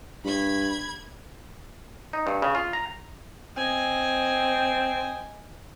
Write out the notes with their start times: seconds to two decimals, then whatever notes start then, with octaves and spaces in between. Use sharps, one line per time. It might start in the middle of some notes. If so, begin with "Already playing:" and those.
0.24 G2 B5 G#6
2.13 D#4
2.27 G2
2.42 C#3
2.55 F4
2.73 A#5
3.57 C4 D#5 G#5